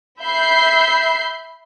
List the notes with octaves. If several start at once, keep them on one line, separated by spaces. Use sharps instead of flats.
E5 B5 G6 C7